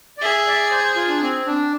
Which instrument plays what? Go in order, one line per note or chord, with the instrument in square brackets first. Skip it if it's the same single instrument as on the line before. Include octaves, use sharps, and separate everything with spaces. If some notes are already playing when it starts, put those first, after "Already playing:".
[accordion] D5
[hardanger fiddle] G#4 [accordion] E5
[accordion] D5
C5
C5
F4
D4
C4
D4